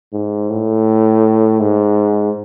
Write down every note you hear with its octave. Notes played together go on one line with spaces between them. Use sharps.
G#2
A2
G#2